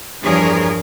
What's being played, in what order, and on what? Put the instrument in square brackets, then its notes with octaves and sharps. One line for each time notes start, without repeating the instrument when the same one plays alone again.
[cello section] E2 G2 F3 G#4 A#4 C#5